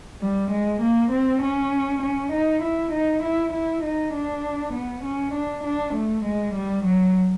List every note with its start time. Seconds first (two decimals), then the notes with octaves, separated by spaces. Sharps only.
0.22 G3
0.52 G#3
0.82 A#3
1.12 C4
1.42 C#4
2.03 C#4
2.33 D#4
2.63 E4
2.93 D#4
3.23 E4
3.53 E4
3.83 D#4
4.14 D4
4.74 B3
5.04 C#4
5.34 D4
5.64 D4
5.94 A3
6.25 G#3
6.55 G3
6.85 F#3